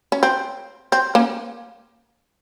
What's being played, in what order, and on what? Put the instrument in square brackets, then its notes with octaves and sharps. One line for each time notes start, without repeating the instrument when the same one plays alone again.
[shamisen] C#4
C4
C4
A#3 C#4